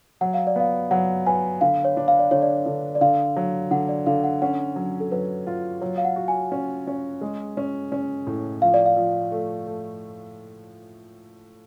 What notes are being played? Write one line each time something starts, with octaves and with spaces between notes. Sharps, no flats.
F#3 F#5
F5
D5
B3 F5
F#3 F#5
B4 G#5
D3 F5
C#5
D4
F5
D5
D3 C#5
D5
D3
D5
D3 F5
F#3
D3 F#5
D5
D3 F5
F#5
C#4 F#5
F#3
A4
F#3 B4
F4
F#3 C#5
F5
F#5
F#4
G#5
C#4
C#4
G#3
C#4
C#4
A2
F3 F5
D5
F5
F3
A3
A3